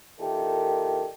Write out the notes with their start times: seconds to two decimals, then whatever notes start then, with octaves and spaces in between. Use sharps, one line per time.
0.20 A#2 D#3 E4 G4 A4